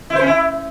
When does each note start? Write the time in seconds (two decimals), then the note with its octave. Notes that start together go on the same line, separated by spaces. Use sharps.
0.10 E4
0.15 C5
0.21 C#4
0.26 E4